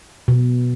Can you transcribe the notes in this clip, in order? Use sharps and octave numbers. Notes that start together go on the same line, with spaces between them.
B2